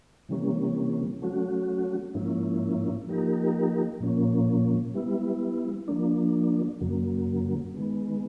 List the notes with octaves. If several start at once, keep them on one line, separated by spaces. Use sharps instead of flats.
C3 E3 G3 A#3 C#4
F#3 A3 C#4 F#4
G#2 F3 A#3 C#4 E4
F3 A#3 D#4 G4 A#4
A#2 F3 A#3 C#4
G3 B3 E4
F3 A#3 D4
F#2 C#3 F#3 A#3
D#3 G#3 B3